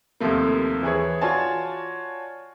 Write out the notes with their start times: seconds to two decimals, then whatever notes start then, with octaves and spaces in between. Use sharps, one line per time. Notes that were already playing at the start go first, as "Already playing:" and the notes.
0.20 D#2 C3 F3 A3 A#3
0.83 E3 G#4 C#5
1.21 F4 F#4 C#5 D5 G#5 A5